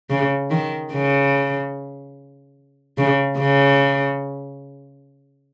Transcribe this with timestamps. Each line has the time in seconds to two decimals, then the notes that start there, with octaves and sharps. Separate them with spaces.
0.10 C#3
0.50 D#3
0.92 C#3
2.98 C#3
3.39 C#3